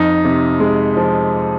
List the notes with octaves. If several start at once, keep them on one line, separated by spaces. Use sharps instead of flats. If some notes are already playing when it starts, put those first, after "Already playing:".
Already playing: F2 D#4
C3
G#3
F3